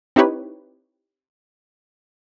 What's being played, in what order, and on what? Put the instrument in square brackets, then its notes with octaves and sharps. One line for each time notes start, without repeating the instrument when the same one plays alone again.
[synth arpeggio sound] C4 D#4 E4 G4 B4 C#5